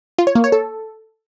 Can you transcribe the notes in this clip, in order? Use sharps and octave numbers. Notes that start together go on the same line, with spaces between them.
F4
C#5
A#3
C#5
A4